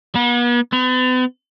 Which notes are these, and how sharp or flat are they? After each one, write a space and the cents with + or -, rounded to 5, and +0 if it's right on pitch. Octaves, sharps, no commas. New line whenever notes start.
B3 -40
B3 +45